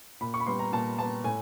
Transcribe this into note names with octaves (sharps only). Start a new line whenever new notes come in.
A#2 B5
C#6
B5
G3 B3 C6
A#5
A#2 A5
G3 B3 A5
A2 G#5